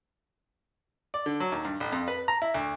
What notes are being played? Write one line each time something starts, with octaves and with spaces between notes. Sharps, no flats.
D5
D3
F#3
D#2
G2
A1
F2
B4
A#5
E4
D2